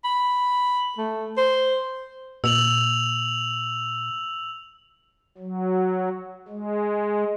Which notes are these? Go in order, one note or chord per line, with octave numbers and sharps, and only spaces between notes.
B5
A3
C5
A#2 E6 F7 F#7
F#3
G#3